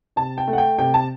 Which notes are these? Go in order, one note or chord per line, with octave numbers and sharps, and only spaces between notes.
C3 A5
G5
A3
F#5
G5
C3 G5
A5